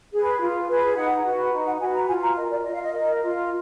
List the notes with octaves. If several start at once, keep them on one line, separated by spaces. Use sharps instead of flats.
G#4 B4
F4
G#4 B4
D#4 F#5
F#4 B4
D#4
F#5
F#4 B4 G#5
A#5
F4 G#5
A#5
A#4 D#5
D5
F4 D#5
F5
D#5
A#4
F4